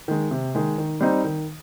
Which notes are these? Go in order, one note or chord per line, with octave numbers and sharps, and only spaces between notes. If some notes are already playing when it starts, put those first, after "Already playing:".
D#3 G#3
C3
D#3 G#3
D#3
G3 C4 D#4
D#3